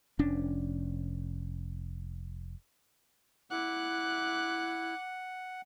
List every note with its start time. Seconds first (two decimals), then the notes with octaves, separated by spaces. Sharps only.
0.19 F1 C#4 D4
3.51 E4 F#5 D6 F#6